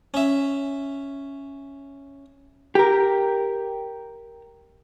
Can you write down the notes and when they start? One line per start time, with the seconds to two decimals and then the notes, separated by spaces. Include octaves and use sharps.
0.14 C#4 E5
2.75 G4 A#4